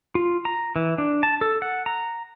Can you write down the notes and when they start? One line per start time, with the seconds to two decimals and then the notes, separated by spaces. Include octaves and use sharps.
0.15 F4
0.45 A#5
0.76 E3
0.98 D4
1.23 A5
1.41 A4
1.62 F#5
1.86 A#5